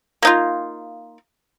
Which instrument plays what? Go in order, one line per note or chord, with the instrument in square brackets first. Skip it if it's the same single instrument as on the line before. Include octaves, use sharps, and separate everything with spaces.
[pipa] A#3 D#4 F4